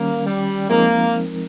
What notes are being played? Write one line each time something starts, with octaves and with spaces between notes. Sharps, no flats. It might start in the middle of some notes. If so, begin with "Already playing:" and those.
Already playing: D#3 G3 A#3 C#4
G3
F3 G#3 A#3 C4 D#4 A#4